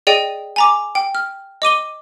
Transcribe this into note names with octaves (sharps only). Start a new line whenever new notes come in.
G#4 D5 D#5 G5 D#7
G#5 A#5 D6
G5
F6
D#5 D6 D#7 G7